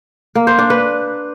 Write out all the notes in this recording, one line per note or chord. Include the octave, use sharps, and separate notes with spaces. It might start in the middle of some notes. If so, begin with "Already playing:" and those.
A#3
C5
D4
B4